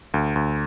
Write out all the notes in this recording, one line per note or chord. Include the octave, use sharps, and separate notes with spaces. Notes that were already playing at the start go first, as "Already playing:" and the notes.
D2
D2